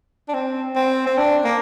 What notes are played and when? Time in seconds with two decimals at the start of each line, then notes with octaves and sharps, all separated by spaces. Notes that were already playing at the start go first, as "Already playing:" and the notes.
0.28 D4
0.34 C4
0.76 C4
1.06 C4
1.17 D4
1.45 A#3